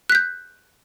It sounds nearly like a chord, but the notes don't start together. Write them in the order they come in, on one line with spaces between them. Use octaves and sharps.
F#6 B6 G6